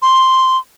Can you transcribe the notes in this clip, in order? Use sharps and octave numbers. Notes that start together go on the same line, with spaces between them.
C6